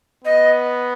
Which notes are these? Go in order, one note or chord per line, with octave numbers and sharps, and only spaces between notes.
B3 D#5